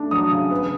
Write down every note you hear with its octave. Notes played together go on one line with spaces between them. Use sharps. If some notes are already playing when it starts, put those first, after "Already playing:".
Already playing: A3 D4
F#3 D#6
C#3
B3